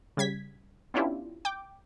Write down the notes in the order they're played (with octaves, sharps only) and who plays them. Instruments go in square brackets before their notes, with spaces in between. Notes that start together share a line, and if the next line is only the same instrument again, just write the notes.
[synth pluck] C#3 G3 G#6 B6
B3 C#4 D4 E4 F4 G4
G5 D6